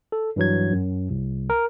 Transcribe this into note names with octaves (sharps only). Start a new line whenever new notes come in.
A4
G2 E3 F#3 G#6
F#2
C2
A#4